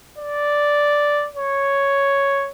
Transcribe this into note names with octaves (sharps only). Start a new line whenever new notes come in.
D5
C#5